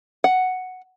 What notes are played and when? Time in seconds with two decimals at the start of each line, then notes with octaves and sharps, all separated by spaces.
0.24 F#5